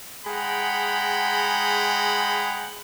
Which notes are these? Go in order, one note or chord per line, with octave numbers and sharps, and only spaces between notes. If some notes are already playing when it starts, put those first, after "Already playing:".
G#3 G#4 F#5 G5 A#5 B5